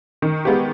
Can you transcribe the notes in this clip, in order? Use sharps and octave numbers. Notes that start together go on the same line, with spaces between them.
D#3
G#3 B3 G4